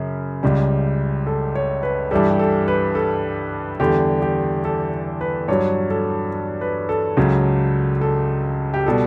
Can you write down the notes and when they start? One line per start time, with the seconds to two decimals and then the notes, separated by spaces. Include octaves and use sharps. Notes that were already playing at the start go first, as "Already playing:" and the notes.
Already playing: F#2 C#3
0.43 C#2 C#3 G3
1.27 A4
1.55 C#5
1.83 B4
2.11 G2 E3 G3 A4
2.30 G4
2.39 A4
2.68 B4
2.95 A4
3.80 E2 D3 G3 G4
4.22 G4
4.65 A4
5.21 B4
5.48 G2 F#3 C#5
5.90 A4
6.61 B4
6.89 A4
7.17 C#2 C#3 F#3
8.01 A4
8.74 G4
8.86 B2 G3 A4